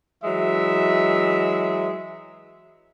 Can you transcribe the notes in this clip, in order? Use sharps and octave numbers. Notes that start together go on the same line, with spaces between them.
E3 F#3 G#3 E5